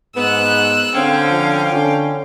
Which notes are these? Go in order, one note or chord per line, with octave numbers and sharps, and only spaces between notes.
G#2 B3 E6 F#6
D3 C4 C#4 F5 G5
F3
D3 C#4